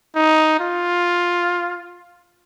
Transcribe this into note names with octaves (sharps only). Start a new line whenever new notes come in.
D#4
F4